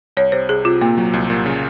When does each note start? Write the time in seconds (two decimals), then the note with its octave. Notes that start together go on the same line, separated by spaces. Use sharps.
0.17 C2 C#5
0.32 C3 C5
0.49 C2 G#4
0.65 C3 F4
0.81 A#2 A#3
0.98 F#3
1.13 C2
1.30 A#2
1.46 C#3